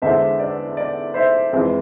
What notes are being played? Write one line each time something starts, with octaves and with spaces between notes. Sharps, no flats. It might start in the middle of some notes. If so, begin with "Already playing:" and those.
E2 D3 G#3 C5 E5
D5
D5
C5 E5
F2 E3 G#3